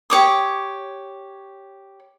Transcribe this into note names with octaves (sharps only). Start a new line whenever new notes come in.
G4 C#5 D6 D#6